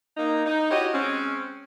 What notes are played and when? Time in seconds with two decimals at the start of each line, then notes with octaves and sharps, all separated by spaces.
0.17 A#3 D#4
0.46 D#4
0.71 E4 F#4 G4 C#5 D#5
0.93 G#3 C4 C#4